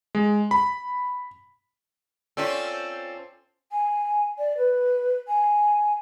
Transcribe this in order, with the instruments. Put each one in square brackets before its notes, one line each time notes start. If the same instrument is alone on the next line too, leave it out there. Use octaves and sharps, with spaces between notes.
[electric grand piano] G#3
B5
[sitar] C4 C#4 F4 [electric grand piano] A4 D5 G5
[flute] G#5
D5
B4
G#5